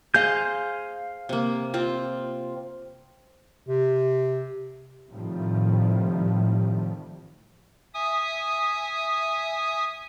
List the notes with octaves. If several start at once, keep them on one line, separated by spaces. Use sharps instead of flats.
G#4 C5 D#5 F5 G6
C3 A#3
C4 F4
C3
A2 C3 D#3 F3 G3
E5 G#5 D#6